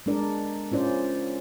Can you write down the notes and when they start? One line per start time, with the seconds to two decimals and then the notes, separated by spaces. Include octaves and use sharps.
0.06 G#3 B3 D4 A#4 D5
0.72 C#4 F4 C5 D5